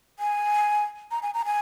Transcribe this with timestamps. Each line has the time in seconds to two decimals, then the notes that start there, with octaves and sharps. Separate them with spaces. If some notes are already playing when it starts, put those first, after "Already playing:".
0.19 G#5
1.11 A#5
1.22 G#5
1.34 A#5
1.45 G#5